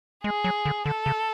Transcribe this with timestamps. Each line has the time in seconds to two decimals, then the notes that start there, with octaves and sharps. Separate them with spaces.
0.24 G#3 G#4
0.44 F#3
0.65 D3
0.85 D3 A4
1.06 C#3